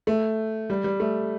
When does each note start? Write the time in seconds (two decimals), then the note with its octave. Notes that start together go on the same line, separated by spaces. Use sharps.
0.07 A3
0.70 G3
0.84 G3
1.00 A3